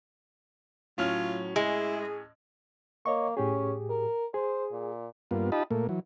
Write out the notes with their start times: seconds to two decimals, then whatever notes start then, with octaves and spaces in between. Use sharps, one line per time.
0.98 A2 F#3 C#4 F4 F6
1.56 G#3 E4 G#4
3.06 A#3 C#5 D#5 C#6
3.37 A2 C#4 G4 G#4
3.90 A#4
4.34 G#4 C5
4.72 A#2
5.31 G2 A#3 B3 F4
5.52 D#4 F4 G4 D#5 A5 B5
5.71 A#2 A3 A#3
5.89 E3 F#3